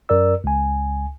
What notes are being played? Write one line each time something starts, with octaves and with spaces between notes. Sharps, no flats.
F#2 A#4 D5 E6
C#2 G#5